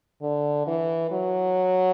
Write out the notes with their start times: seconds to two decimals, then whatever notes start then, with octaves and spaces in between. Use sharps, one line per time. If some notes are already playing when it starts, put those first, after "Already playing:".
0.22 D3
0.67 E3
1.11 F#3